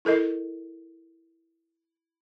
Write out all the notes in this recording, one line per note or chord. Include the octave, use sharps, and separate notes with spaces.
E4 A4 A#4 D#5